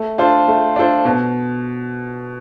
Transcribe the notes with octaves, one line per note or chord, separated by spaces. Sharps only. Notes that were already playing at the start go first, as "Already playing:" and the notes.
Already playing: A3
D4 F4 A4 C5
A3
D4 F4 A4 C5
B2